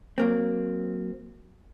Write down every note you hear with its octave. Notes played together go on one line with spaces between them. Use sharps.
F#3 A#3 C4